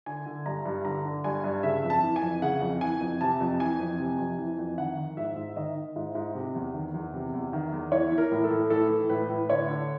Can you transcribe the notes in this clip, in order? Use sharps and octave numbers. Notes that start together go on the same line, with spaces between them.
D3 G#5
D3
G2 A#5
G2
D3 A#5
D3
G2 G#5
G2
C#3 E5
F2
A5
E3
G#5
F2
C#3 F#5
F2
E3 G#5
F2
C3 A5
F2
E3 G#5
F2
C3
F2
E3
F2
D#3 F#5
D#3
G#2 E5
G#2
D#3 D#5
D#3
G#2
G#2
C3
E2
D#3
E2
C3
E2
D#3
E2
E3 C#5
E3
A#4
A2
A4
A2
E3 A4
E3
A2 B4
A2
D3 C#5
D3